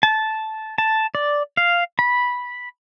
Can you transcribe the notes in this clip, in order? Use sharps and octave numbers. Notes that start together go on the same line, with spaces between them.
A5
A5
D5
F5
B5